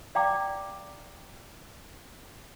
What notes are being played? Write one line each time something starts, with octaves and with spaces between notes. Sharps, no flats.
D5 F5 G5 A#5 D6